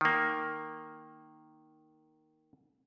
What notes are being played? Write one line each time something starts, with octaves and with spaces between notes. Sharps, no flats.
D#3 A#3